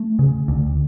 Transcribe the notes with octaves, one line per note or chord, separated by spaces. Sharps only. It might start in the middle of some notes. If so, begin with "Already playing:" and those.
Already playing: A3
C#3
D2